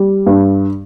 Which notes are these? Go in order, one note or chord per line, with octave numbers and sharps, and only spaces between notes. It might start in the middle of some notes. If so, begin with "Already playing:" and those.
Already playing: G3
G2